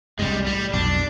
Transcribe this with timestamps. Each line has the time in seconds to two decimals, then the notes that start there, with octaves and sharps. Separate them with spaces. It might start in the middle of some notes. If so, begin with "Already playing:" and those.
0.19 C2 G2 G3 G#3
0.46 A2 G3
0.73 B1 F2 B2 D4